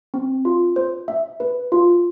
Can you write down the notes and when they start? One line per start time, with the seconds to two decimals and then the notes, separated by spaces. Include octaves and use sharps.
0.14 C4
0.45 F4
0.76 C5
1.08 E5
1.40 B4
1.72 F4